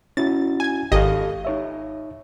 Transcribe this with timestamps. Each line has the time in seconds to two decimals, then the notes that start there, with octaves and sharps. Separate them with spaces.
0.17 C#4 E4 F#4 A6
0.60 G#5 G#6
0.92 G#1 G4 A4 D#5 F5
1.45 D#4 C#5 E5